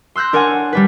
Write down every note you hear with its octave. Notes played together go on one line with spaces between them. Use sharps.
C6 E6 F#6 G6 A#6
D4 A#4 C#5 F#5 G#5
G3 D4 B4